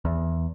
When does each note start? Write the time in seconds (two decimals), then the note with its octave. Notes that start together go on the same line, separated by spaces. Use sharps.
0.05 E2